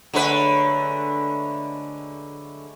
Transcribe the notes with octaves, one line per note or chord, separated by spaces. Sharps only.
D3 F#3 G#3 A3 B4